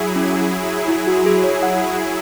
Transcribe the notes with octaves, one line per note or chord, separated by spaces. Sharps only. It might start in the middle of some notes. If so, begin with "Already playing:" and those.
Already playing: F#3 E4 G#4
C#4
E4
F#4
G#4
C#5
F#5